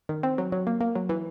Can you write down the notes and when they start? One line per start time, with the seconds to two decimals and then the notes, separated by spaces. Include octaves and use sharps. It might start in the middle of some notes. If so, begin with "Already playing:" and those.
0.09 D#3
0.23 C4
0.38 F#3
0.52 F#3
0.67 A#3
0.81 A#3
0.96 F#3
1.09 E3